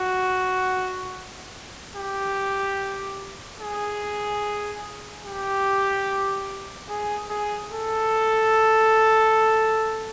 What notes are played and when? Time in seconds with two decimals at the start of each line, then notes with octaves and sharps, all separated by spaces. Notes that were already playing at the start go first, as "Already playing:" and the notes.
Already playing: F#4
1.96 G4
3.60 G#4
5.25 G4
6.89 G#4
7.30 G#4
7.72 A4